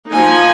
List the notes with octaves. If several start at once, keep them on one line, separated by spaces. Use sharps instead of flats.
F3 A#3 D#4 G#5